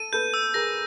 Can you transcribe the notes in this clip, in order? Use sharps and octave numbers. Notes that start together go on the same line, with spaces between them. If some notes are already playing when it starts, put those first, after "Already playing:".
Already playing: A4 D#7
A4 B4 G6
E6
G#4 A#4 A#6